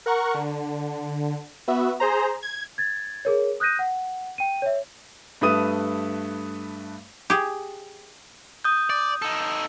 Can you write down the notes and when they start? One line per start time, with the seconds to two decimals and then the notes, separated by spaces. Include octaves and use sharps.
0.06 A#4 F#5 C#6
0.34 D3
1.68 B3 F#4 E5
2.00 G#4 C5 A#5
2.43 G#6
2.78 G#6 A6
3.25 G#4 A#4 C#5
3.60 D#6 F#6 G6 A#6 D#7
3.79 F#5
4.38 G5 D#7
4.62 C#5 E5
5.41 G2 A3 B4 D#6 D#7
7.30 G4 G#4
8.64 D#6 G6
8.90 D5
9.22 D#4 A4